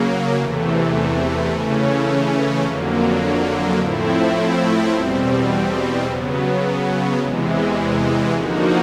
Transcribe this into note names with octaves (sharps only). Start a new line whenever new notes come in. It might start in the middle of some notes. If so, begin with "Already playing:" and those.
Already playing: C#3 F#3 A#3
E2 C3 E3 A3
C#3 E3 A3 C#4
F2 D3 F#3 A#3
A2 F3 A3 C4 E4
E2 B2 G3 C4
C#3 F#3 B3
E2 C3 E3 G#3
D3 F3 A#3 D#4 F#4